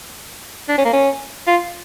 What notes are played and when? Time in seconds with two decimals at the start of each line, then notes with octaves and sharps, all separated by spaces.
0.69 D4
0.78 C#4
0.85 A#3
0.93 C#4
1.47 F4